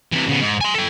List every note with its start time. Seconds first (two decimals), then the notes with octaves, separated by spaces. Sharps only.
0.12 C3 E3
0.29 C#3 B3
0.41 G#2
0.61 G#5 C6
0.74 A4 G5